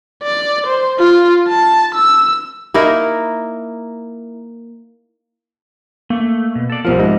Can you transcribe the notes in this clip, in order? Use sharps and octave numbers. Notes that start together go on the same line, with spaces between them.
D5
C5
F4
A5
E6
A#3 D#4 E4 A#4
A3 A#3
B2
A4 D5
C2 F3 G3 C4 F4 A#4
G#2 D#5